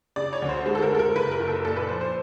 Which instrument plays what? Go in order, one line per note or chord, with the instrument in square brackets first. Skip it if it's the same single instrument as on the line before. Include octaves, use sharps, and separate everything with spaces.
[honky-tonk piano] C#3 D5
C#5
D2
C5
G#3 C5
A4
A#4
G#3 A4
A#4
F#1 B4
A#4
F#1
A4
A#2 A4
B4
F3 C5
C5